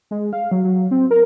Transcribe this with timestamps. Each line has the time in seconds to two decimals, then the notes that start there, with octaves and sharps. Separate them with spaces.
0.11 G#3
0.33 F5
0.52 F#3
0.64 F#3
0.91 C4
1.11 A#4